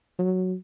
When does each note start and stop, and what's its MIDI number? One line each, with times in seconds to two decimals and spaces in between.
0.19 0.54 54